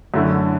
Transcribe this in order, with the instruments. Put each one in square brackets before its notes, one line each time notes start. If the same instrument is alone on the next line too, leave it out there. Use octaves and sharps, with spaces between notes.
[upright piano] F#2 D3 A3 E4